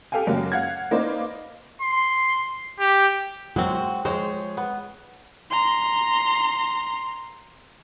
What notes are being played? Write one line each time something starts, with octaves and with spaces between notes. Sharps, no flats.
G4 A4 F5 G5 G#5
F#2 C#3 F#3 A#3
F5 F#5 G#6
A#3 D#4 B4 C5 D5 D#5
C6
G4
F#3 G#3 A#3 C4 F#4
F#4
F3 G#3 G#4 C5 C#5
B3
A#5 C6